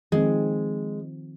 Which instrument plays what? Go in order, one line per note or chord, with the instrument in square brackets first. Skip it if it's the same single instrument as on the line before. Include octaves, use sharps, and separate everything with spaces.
[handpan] D#3 F3 C4 [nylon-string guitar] G#3